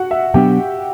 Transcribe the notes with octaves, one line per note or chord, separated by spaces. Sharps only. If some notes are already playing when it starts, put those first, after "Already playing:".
Already playing: F#4 F#5
E5
B2 F#3 B3 D4 G4 G5